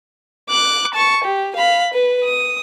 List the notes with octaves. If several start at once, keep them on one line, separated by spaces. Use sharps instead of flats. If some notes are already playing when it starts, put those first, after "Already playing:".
D6 F#6
A5 C#6
G4
F5 B5
B4
D#6